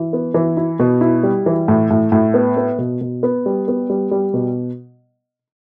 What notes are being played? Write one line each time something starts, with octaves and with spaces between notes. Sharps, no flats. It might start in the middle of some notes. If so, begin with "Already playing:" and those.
Already playing: E3
B3
E3
E4
B2
E4
G3
E3
A2
A2
A2
B3
B3
B2
B2
B3
G3
B3
G3
G3
B2